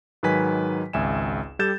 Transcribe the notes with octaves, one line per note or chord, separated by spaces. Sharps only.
G#2 D#3 F#3 B4 G#5 B6
G#1 C#2 E5 G#5 E7
G3 G4 A4 G6 A6 E7